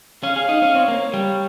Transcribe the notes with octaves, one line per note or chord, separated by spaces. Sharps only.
C#4 F5
G#4
D#4
C#4
C4 C#5
A#3
G3